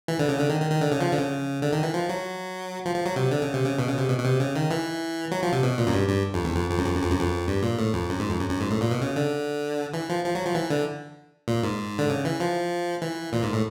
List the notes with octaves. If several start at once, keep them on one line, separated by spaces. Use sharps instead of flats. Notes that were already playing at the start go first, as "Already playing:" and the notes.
E3
D3
C#3
D3
D#3
D#3
D#3
D3
C#3
F3
D3
C#3
D3
D#3
E3
F3
F#3
F3
F3
F#3
C3
D3
C#3
C3
C#3
B2
C#3
C3
B2
B2
C3
C#3
D#3
E3
F#3
F3
C3
B2
A#2
F#2
G2
G2
F2
E2
F2
F2
F#2
F2
F#2
F2
F#2
F2
G2
A#2
A2
F2
F#2
G#2
F2
F#2
F#2
G#2
A2
A#2
B2
C#3
D3
E3
F3
F3
F#3
F3
E3
D3
A#2
G#2
D3
C#3
E3
F3
E3
A#2
G#2
A2